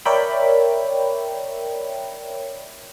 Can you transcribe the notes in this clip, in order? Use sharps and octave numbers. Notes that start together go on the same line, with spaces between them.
A#4 C#5 D5 E5 G5 B5